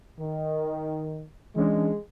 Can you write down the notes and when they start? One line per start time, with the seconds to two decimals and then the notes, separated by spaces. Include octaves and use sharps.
0.19 D#3
1.56 E3 G#3 C#4 D4